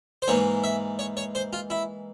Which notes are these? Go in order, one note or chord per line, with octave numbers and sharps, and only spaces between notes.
C5
G#2 E3 A#3 C#5
E5
C#5
C#5
C5
F4
E4